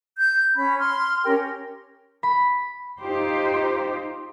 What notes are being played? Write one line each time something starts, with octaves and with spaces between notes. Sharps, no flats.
G6
C#4 B5
C6 F6
C#4 G4 A#4 G5
B5
D#4 F4 G4 C5